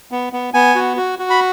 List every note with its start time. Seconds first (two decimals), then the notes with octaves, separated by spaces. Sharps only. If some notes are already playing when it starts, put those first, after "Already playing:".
0.11 B3
0.33 B3
0.54 B3 G#5
0.75 F#4
0.97 F#4
1.19 F#4
1.30 B5